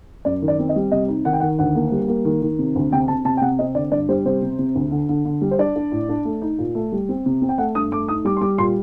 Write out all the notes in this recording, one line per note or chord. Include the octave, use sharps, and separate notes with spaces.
F#2 D5
D#3
D5
C4
D#5
G3
C3 D#5
D#4
D#3 F#5
G5
D#3 F#5
D2 F#5
A#3
G3
A#3
D#3
D#3
C3
D2
C3 G5
C3 A5
C3 A5
G5
C3 F#5
C4 D#5
D3 D5
G2 D5
G3 C5
C3 C5
C3
C3
D2
D3
D3
D3
G3
C5
D4 D5
D4
A2
D4
A3
D#4
A#2
A3
G3
C4
C3
C4
G5
A3 F#5
G2 D#6
A3 D6
D#4 D#6
G3 D6
C6
G3 D6
A#2 C6